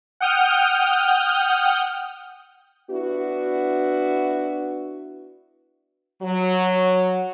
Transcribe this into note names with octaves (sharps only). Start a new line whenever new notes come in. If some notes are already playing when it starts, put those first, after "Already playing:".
F#5 G5 D#6 F6 G6
B3 D4 E4 F#4
F#3